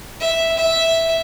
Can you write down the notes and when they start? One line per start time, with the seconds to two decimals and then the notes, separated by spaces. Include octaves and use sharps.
0.20 E5
0.57 E5